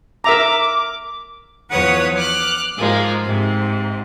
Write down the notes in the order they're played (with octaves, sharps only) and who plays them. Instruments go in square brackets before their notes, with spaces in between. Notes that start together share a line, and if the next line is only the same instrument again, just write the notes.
[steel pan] A#4 E5 A#5 [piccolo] D6
[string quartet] E2 F3 B4 C#5 F#5 D#6
D6 F6 F#6
G#2 F3 G#3 A#3
G#2 C3